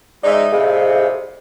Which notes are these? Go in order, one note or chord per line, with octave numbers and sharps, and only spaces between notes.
G#2 D#4 D5 E5
A2 C3 G#4 D#5 F5